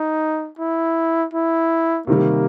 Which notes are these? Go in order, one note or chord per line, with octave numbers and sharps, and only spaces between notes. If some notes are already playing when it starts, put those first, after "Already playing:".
Already playing: D#4
E4
E4
C3 D#3 G3 A#3